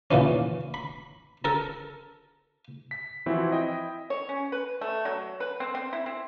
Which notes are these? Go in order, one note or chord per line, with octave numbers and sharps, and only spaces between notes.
D#2 A#2 E3 C#4
B5
A4 A#4 A5
B6
E3 F3 C4 E4 F#4
E4 D#5 G5
C#5
C#4
B4
A3
F#3
B4
C4
C4
E4
C4